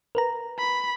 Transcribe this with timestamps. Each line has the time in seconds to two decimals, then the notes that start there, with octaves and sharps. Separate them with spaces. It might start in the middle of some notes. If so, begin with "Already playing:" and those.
0.15 A#4 B4 A#5
0.58 B5